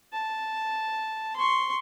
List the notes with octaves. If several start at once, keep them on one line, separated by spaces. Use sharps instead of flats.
A5
C6 C#6